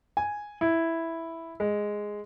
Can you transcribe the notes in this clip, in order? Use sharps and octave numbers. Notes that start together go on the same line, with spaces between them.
G#5
E4
G#3